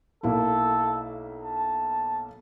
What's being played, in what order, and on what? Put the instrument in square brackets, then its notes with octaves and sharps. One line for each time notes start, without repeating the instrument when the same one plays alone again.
[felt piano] B1 A#3 E4 [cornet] A4
[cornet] A5